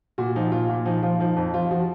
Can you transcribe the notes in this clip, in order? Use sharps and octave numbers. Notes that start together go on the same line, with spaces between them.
A#2 F#4
F3 D#4
A#2 F4
A#2
F3 D#4
F3 F4
F3 D#4
F2 D#4
F3 F4
F3 F#4